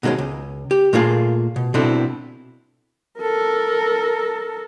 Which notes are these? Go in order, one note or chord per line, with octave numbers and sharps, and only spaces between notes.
B2 D#3 G#3 C4 C#4
C#2
G4
A#2 A3 A#3 F4 G#4
B2
B2 C4 D4 E4 A4
A4 A#4